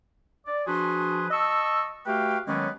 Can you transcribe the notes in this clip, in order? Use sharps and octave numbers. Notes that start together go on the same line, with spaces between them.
D5
F3 D4 F#4 G#4 B4 C6
D#5 A5 C#6 E6
A3 F#4 G4 B4 F5 G5
D#3 F#3 G#3 A#3 B3 C#4